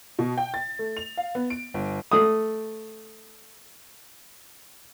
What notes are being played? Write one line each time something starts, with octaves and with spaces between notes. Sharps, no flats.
B2
G5
A6
A3
F7
F5
B3
D7
G1
A3 D#6